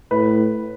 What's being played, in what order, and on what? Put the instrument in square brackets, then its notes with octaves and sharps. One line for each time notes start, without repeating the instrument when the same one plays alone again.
[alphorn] A2 [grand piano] B4